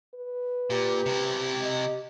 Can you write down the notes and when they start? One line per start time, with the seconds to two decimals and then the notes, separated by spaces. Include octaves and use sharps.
0.15 B4
0.70 A#2 G4
1.06 C3 E4
1.61 D#5